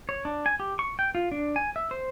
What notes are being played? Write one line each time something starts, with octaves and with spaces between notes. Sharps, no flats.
C#5
D4
G#5
G4
C#6
G5
F4
D4
G#5
E5
C5